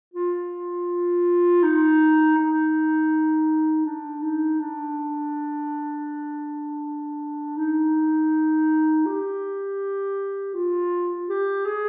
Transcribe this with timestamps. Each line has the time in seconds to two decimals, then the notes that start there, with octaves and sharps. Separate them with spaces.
0.14 F4
1.63 D#4
2.37 D#4
3.85 D4
4.23 D#4
4.60 D4
7.58 D#4
9.06 G4
10.54 F4
11.30 G4
11.66 G#4